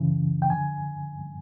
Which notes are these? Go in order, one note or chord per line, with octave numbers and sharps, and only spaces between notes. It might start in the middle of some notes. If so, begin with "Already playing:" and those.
Already playing: F#2 C#3 E3
G5
F2 D3 G#5